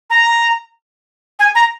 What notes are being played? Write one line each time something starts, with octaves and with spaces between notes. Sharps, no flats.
A#5
G#5
A#5